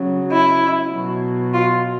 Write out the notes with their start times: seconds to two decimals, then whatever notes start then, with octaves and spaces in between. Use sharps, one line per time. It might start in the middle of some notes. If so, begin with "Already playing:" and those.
Already playing: C#3 F#3
0.30 E4
0.91 B2 F#3
1.53 F4